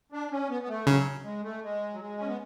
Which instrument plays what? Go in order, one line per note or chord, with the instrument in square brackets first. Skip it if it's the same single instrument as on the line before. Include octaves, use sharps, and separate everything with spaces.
[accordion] D4
C#4
B3
B3
A3
[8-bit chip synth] C#3 [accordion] F#3
[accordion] G#3
A3
G#3
F#3
G#3
C#4
B3